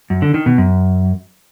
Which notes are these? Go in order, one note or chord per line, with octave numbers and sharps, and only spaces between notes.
F#2
D3
D#3
B2
F#2